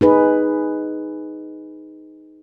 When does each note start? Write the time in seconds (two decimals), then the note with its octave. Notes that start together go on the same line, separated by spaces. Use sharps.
0.01 D#4 G#4 B4